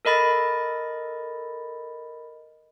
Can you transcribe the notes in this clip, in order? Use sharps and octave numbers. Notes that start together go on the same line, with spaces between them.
A4 A#4 D#5 B5 A6